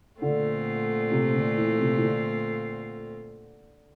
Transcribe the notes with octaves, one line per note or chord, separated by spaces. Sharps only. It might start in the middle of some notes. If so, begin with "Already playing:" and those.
A#2 D3 A3 C4 F4
C3
D3
E3
C3
E3
D3